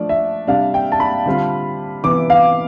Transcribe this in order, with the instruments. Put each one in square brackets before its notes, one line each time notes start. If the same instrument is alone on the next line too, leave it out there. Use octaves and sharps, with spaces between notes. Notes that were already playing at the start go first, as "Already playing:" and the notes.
Already playing: [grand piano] F3 A3 D4 [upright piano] D5
[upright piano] E5
[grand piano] C3 G3 D4 [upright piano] F5
[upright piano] G5
A5
B5
[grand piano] D3 G3 C4 F4
[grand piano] C3 E3 B3 [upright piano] D6
[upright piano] F5